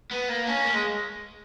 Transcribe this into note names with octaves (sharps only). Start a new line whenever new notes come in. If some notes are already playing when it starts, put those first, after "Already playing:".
B3
A#3
C#4
A#3
G#3